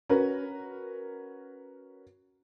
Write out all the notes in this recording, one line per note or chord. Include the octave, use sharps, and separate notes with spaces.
C#4 F#4 A#4 B4